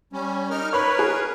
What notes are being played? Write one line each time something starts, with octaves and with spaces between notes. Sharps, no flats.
G3 C#4
D#4 A#4 F6
A#4 B4 C#5 B5
G#4